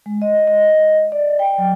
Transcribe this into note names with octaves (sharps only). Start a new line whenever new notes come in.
G#3
D#5
D#5
D5
G5
F#3